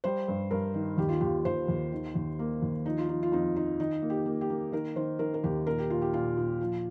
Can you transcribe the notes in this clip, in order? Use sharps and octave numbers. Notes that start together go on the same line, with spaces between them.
G3 C5
G2
G2 A#4
D#3
D#2 G4
F4
D#2 G4
D#2 C5
D#2
D#3
D#2
A#3
D#2
F3 D#4
F4
F3 D#4
F4
F2 D#4
F3 D#4
D#3 D#4
A#3
G4
A#3
G4
A#3
D#3 A#4
D#3 C5
D#3 A#4
A#4
D#2 G4
A#2 A#4
G4
A#2 F4
G4
A#2 F4
A#2
F3